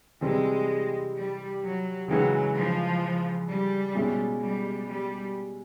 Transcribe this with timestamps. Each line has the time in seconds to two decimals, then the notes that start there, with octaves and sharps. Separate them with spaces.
0.21 C3 E3 G3 G#3 C4
1.15 G3
1.62 F#3
2.08 C#3 E3 F#3 G#3
2.55 F3
3.48 G3
3.95 B2 G#3 C#4 E4
4.42 G3
4.88 G3